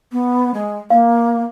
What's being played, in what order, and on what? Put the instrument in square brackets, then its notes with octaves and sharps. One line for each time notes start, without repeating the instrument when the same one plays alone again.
[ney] B3
G#3
[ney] A#3 [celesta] F5